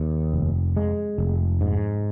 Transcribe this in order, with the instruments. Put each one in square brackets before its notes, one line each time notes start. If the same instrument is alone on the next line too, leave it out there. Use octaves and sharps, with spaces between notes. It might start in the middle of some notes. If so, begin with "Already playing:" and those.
Already playing: [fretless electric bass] D#2
F1
G#3
F1
G#2